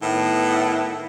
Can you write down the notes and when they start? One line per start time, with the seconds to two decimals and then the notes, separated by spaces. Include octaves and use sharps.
0.01 A2 D#3 B3